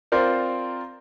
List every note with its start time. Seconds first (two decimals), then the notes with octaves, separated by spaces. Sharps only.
0.12 C4 F4 A#4 C5 D5